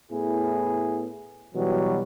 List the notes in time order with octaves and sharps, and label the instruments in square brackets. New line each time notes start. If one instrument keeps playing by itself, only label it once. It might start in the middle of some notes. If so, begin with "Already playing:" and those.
[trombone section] A2 B3 E4 G#4
B2 E3 F#3 G3